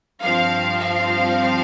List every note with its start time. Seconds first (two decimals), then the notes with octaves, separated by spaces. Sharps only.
0.21 G2 F3 C4 F5
0.79 F5